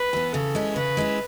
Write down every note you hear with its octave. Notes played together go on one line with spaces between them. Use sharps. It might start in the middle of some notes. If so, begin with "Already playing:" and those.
Already playing: B4
E3 B3
C#3 A4
G#3 C#4 E4
C#3 B4
G#3 C#4 E4